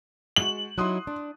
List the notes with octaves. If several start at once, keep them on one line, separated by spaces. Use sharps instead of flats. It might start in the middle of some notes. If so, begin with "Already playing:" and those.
G#3 F#4 F#7
F#3 D#4 E4 C6 D#6 F#6
D4